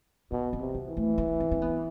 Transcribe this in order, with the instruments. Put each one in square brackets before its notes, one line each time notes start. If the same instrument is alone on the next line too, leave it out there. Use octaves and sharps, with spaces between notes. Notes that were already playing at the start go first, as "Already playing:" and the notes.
[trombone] B2 [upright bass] B3
[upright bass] C4
[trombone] C3
[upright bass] B3
[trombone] E3
[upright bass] A3
B3
C4
C4
B3